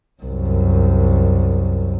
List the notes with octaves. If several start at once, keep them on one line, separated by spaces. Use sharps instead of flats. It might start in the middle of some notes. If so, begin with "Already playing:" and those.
C2 F#2